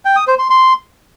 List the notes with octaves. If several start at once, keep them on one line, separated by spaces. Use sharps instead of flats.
G5
D#6
C5
C6
C6